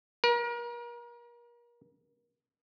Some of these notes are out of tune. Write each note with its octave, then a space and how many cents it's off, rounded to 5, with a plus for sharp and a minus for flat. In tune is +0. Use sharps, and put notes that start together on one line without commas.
A#4 +35